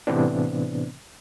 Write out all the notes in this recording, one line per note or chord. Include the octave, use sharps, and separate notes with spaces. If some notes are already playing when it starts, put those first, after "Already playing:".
A2 C3 E3 B3 C4 D4